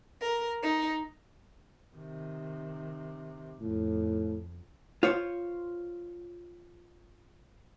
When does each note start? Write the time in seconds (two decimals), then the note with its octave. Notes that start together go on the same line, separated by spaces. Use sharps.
0.21 A#4
0.62 D#4
1.95 C3 D#3
3.61 F2 A2
5.03 F4 C5 C#5